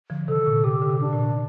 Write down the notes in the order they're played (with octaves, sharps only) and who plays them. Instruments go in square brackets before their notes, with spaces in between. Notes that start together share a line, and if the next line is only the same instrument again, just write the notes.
[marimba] D3 F3
[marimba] C3 D#3 [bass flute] A4
[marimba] A#2 D3
[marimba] C3 [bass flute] G4
[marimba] D3
C3
[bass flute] D4
[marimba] A#2